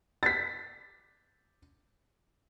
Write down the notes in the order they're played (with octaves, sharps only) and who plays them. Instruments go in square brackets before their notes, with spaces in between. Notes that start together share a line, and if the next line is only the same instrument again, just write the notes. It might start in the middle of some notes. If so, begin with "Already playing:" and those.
[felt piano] A6 B6